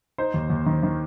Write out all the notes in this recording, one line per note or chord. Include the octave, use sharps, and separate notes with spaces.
D#4 C5
D#2
D#2
D#3
D#3